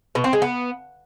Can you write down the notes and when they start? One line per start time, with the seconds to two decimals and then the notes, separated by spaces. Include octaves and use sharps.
0.15 B2
0.24 C4
0.33 G#3
0.42 B3